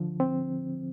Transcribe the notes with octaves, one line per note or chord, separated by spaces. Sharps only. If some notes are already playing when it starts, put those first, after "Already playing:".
Already playing: D2 D3 F3
C4